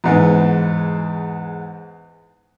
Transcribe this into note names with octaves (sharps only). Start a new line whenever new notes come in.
E2 G#2 B3